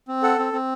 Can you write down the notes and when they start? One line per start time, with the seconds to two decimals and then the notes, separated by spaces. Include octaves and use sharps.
0.08 C4
0.23 A4 F#5
0.39 C4
0.53 C4